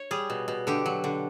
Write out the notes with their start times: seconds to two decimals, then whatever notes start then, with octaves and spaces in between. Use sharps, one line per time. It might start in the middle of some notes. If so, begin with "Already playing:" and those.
Already playing: C#5
0.11 G3 G#4
0.30 B2
0.48 B2
0.67 D3 G4
0.86 F#3
1.04 D3